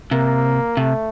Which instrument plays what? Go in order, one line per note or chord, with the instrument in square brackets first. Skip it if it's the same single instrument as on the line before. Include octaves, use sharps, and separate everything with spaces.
[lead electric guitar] C3 [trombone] A#3
[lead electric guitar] C3 [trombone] A3